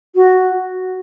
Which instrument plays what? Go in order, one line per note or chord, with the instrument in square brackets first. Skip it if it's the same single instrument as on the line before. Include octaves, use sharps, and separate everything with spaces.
[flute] F#4